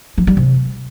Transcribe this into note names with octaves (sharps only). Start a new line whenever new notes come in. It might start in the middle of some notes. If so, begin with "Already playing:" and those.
F3
G3
C3